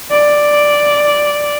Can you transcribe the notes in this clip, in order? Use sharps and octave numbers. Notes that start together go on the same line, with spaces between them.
D5